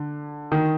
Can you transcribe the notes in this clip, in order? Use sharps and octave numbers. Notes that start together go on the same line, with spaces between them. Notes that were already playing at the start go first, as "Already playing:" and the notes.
Already playing: D3
D#3